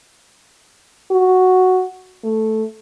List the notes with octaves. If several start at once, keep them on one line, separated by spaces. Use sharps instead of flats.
F#4
A3